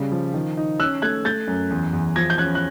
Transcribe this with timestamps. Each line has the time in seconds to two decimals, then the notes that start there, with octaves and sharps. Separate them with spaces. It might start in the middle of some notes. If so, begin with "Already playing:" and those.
Already playing: C#3 G3
0.12 F3
0.34 D#3
0.57 D#4
0.80 C#4 E6 F#6
1.02 A3 F#6 G#6
1.25 A3 G6 A6
1.47 F#2
1.71 E2
1.93 E2
2.16 F3 G#6 A#6
2.30 G6
2.38 C#4 F#6 G#6
2.55 F#6